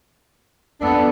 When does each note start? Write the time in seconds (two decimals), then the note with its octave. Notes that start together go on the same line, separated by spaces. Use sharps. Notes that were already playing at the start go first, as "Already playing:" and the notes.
0.81 F2 B3 D4 A4